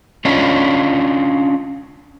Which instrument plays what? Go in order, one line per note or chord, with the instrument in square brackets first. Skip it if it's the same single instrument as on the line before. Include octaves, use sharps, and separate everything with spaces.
[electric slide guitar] C#4 D4 F4 C#5 D#5